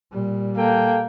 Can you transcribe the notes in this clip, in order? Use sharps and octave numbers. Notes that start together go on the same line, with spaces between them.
A#2 G3
A#3 A4 G5